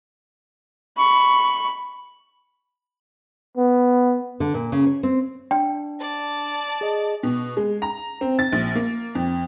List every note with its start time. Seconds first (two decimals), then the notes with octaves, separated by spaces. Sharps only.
0.98 B5 C#6
3.57 B3
4.40 D3
4.54 A#2
4.72 C#3
4.87 C#5
5.03 C4
5.51 D4 G5
6.01 D5 A5
6.81 G#4 D#5
7.23 B2
7.57 G#3
7.82 A#5
8.21 C4
8.39 A6
8.52 A#1
8.75 A#3
9.15 F2